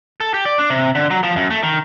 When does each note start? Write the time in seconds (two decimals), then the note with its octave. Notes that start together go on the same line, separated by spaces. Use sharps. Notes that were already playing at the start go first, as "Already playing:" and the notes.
0.20 A4
0.34 G4
0.45 D5
0.58 D4
0.70 C3
0.95 D3
1.10 F#3
1.23 F3
1.36 F#2
1.50 A3
1.63 D#3